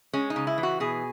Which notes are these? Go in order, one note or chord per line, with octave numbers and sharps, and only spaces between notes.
G#3 C#4
D#4
C#3
E4
E3
F#4
B2 G#4